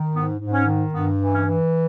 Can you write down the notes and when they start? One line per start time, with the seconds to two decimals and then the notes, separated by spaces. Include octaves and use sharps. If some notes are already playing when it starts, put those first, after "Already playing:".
Already playing: D#3
0.13 G#2 B3
0.39 G#2
0.53 C#4
0.66 D#3
0.93 G2 B3
1.20 E3
1.33 C#4
1.46 E3